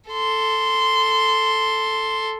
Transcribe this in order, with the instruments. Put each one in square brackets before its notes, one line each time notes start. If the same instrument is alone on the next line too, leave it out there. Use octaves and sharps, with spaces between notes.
[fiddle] A4 C6